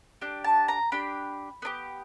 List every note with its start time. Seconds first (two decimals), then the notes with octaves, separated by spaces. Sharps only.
0.21 D4 G4
0.44 A5
0.68 A#5
0.92 D4 G4 B5
1.62 B3 D4 G4